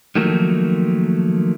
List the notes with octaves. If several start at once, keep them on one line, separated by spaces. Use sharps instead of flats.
D#3 F3 F#3 A3 A#3